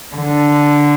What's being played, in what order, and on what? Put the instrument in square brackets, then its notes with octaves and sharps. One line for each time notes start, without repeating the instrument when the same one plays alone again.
[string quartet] D3